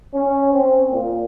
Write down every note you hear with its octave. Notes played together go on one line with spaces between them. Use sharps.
C#4
C4
A#2